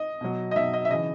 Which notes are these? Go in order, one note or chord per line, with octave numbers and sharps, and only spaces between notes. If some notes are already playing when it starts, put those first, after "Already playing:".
Already playing: D#5
B2 F#3
D#5
B2 F#3 E5
D#5
E5
C#3 E3 D#5